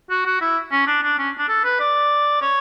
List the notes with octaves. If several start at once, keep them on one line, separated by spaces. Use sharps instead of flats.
F#4
F#4
E4
C#4
D4
D4
C#4
D4
A4
B4
D5
C#5